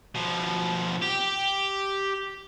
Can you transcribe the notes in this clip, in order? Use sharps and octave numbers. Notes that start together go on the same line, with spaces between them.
B2 F3
G4